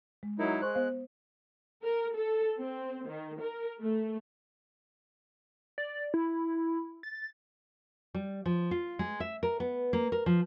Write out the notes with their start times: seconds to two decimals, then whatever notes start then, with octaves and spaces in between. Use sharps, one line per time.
0.23 G#3
0.39 F#3 D#4 E4 A#4
0.62 G#3 C5 C6 C#6 F#6
0.75 B3 C5 F5
1.84 A#4
2.15 A4
2.59 C4
3.07 D#3
3.41 A#4
3.81 A3
5.78 D5
6.14 E4
7.03 A6
8.14 G3
8.46 F3
8.71 F4
8.99 G#3
9.20 E5
9.43 A#4
9.60 B3
9.93 A#3
10.12 A#4
10.26 F3